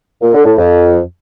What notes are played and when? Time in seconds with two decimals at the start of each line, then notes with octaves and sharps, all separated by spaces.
0.22 A#2
0.33 D3
0.45 A2
0.57 F2